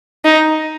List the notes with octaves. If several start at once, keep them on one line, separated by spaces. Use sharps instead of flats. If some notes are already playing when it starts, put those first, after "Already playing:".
D#4